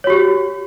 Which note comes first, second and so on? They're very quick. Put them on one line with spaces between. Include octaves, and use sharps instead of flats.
C#5 F#4 G4